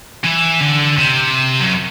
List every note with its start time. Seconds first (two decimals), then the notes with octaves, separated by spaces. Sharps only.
0.24 E3
0.61 D3
0.98 C3
1.60 F#2